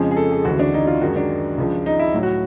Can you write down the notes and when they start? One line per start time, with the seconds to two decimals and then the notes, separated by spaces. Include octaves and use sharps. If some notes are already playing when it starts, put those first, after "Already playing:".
Already playing: F2 C#3 F3 G#3 G#4
0.11 G#4
0.17 A4
0.32 G#4
0.45 D2 C#3 E3 G#3 F#4
0.59 D4
0.74 D#4
0.87 F4
1.01 F#2 D#3 G#3 F#4
1.16 D4
1.58 C#2 C#3 F3
1.86 D#4
1.99 E4
2.14 A2 F#3
2.23 F#4